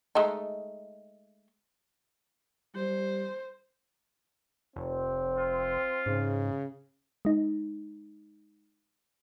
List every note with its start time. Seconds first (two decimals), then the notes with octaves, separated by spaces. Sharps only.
0.15 G#3 A3 D#4
2.75 G3 C5
4.76 F1 C4
5.38 F4
6.06 G#2 C#3
7.25 G#3 D#4